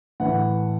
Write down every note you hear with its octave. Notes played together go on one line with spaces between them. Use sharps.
A2 E3 F#5